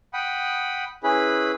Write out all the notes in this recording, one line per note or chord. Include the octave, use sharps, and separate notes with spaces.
F#5 G5 B5 D#6
C#4 E4 G#4 B4 B5